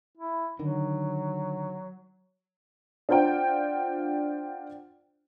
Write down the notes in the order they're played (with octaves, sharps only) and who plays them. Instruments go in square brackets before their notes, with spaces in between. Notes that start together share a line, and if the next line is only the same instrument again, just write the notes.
[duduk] E4
[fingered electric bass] D3 D#3 [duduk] F#3
[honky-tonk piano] D4 F4 C5 F#5 G5